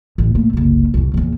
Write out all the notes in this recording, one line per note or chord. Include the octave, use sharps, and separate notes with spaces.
A1
A#2 A3
F#1 C2
C2 F2
A#1 E2